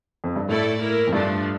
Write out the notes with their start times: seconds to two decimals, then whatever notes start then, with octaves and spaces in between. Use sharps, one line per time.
0.24 F2
0.36 G2
0.49 A2 A3 E4 A4 D5
0.81 A#3 E4 A#4
1.07 F2
1.13 G2 F3 A3 D4